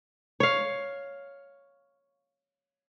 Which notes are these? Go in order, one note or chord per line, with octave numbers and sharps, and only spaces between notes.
C#5 F5